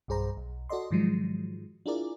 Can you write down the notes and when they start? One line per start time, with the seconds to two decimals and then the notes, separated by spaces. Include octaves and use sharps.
0.08 B1 G2 G#4 C5 A#5
0.37 B1
0.69 F#4 A4 D5 D#5 C6
0.91 G#2 D#3 F3 F#3 G#3
1.86 D4 E4 F4 G#4 A#4 D5